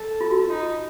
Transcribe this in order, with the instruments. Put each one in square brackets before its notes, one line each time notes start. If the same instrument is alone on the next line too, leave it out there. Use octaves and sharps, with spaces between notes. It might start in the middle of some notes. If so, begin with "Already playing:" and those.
Already playing: [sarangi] A4
[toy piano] F4
F#4
F4
[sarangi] D#4